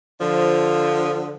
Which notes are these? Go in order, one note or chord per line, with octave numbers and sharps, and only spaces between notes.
D3 F3